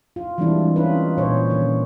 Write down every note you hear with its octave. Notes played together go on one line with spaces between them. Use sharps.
F4
E3 G3 G#3 C4 D4 E4
C#4 D#4 F4 B4
A#2 C5 C#5
D#3 C#4